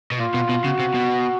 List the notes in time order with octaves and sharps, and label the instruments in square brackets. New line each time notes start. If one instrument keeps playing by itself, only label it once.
[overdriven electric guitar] B2
[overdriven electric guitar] A#2 [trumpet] F4
[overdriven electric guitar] B2
B2
[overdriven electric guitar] C#3 [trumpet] F#4
[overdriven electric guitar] C3
B2